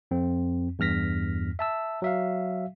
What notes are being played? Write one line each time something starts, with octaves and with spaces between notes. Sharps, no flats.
F2 C4
E2 G2 F6 A#6 B6
E5 A5 E6
F#3 E5 F5